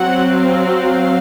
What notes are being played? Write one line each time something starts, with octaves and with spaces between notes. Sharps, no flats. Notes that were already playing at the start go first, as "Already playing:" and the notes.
Already playing: F#3 C4 F#5
F5